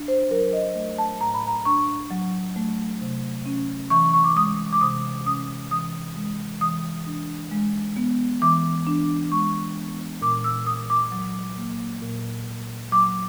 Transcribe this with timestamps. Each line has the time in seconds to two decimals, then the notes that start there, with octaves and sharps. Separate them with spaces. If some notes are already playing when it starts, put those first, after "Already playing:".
Already playing: D4
0.08 C5
0.30 F#3 A#4
0.53 D#5
0.75 A3
0.98 A5
1.21 A2 A#5
1.34 B5
1.47 A#5
1.65 D4 C#6
2.11 F#3
2.56 A3
3.01 C3
3.46 C#4
3.90 E3 C#6
4.13 C#6
4.24 D6
4.36 G#3 D#6
4.73 D6
4.81 C3 D#6
5.26 C#4 D#6
5.71 E3 D#6
6.16 G#3
6.61 E3 D#6
7.06 D4
7.51 G#3
7.97 B3
8.42 E3 D6
8.87 D4
9.32 G#3 C#6
9.77 B3
10.21 A#2 D6
10.44 E6
10.66 A#2 D#6
10.90 D6
11.12 F#3
11.57 A#3
12.02 A#2
12.47 A#2
12.92 F#3 D6